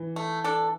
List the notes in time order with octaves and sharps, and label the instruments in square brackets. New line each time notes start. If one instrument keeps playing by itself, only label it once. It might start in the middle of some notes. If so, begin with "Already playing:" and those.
Already playing: [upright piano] E3
[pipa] A3
D4 A4